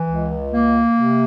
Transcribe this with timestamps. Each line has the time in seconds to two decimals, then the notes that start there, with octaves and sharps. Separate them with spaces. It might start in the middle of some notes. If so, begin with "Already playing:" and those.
Already playing: E3
0.08 C#2
0.53 A#3
0.98 C3